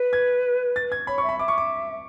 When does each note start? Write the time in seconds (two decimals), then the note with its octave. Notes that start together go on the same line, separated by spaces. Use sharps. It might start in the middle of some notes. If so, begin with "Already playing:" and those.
Already playing: B4
0.13 G#6
0.76 A6
0.92 G#6
1.07 C#5 B5
1.18 C#6
1.23 E5
1.29 B5
1.39 E5 D6
1.48 C#6
1.58 D6